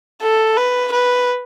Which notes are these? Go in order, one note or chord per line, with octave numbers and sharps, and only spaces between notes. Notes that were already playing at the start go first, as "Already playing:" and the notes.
A4
B4
B4